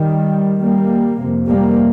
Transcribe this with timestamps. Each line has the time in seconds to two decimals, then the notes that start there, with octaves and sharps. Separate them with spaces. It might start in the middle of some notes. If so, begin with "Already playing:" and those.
Already playing: D#3 G3
0.62 G3 A#3
1.19 F2 C3
1.47 G3 A#3